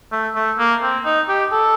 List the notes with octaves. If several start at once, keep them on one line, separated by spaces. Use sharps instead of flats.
A3
A3
A#3
C4
D#4
G4
A4